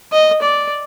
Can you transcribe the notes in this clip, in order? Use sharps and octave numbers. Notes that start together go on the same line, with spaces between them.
D#5
D5